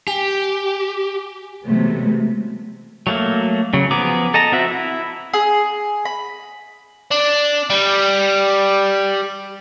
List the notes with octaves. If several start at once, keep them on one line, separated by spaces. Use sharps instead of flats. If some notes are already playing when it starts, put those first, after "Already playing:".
G4 G#5
C3 E3 F#3 G#3 A3 B3
F#3 A3 A#3
C#3 F#3
F3 B3 G#4 A#5 D6
A4 D#5 A5 A#5
C4 F#4 E5
E4
G#4
B5
D4
G3